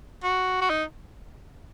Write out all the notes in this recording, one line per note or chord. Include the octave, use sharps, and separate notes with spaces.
F#4
F#4
D#4